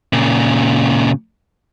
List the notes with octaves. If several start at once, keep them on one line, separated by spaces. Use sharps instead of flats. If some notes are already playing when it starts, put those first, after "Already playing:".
A#2 C#3